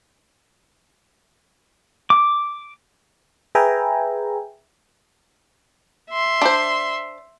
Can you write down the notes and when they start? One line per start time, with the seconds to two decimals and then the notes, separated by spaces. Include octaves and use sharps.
2.10 D6
3.55 G#4 B4 E5 G5 G#5 A#5
6.10 E5 C6
6.42 D4 C5